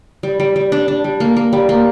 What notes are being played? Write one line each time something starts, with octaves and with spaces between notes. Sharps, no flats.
G3
G3
G3
D4
D4
G3
A#3
A#3
G3
A#3